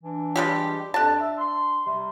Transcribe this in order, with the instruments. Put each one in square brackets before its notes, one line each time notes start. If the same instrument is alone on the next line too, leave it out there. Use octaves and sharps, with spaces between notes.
[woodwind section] E3 D4
[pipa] G3 G#3 G4
[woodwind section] F2 [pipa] D4 A5
[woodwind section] E5
C6
C3 G3